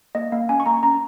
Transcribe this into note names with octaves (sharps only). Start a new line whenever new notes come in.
A#3 D#5
A#3 F5
C#4 G#5
C#6
A#3 A#5
C#4 A#5